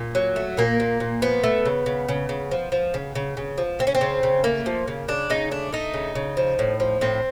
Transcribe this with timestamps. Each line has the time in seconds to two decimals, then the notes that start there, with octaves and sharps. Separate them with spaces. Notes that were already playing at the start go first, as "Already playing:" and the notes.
Already playing: A#2
0.15 F#3
0.36 A3
0.57 A#2 A#3
0.80 A#2
1.00 A#2
1.22 F3 B3
1.44 A3
1.65 C#3
1.86 C#3
2.09 C#3
2.29 C#3
2.51 F3
2.72 F3
2.94 C#3
3.15 C#3
3.37 C#3
3.58 F3
3.79 C#3 C4
3.87 C#4
3.95 C4
4.01 C#3
4.23 C#3
4.44 A3 A#3
4.66 F3
4.88 C#3
5.08 C#3 D4
5.30 C#3 D#4
5.51 A3 D4
5.73 A3 D#4
5.94 C#3
6.15 C#3
6.37 F3
6.59 A2
6.80 F3
7.01 A2 C4